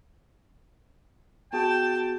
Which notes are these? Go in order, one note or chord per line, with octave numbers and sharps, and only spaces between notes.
B3 F#4 G#4 G5 A5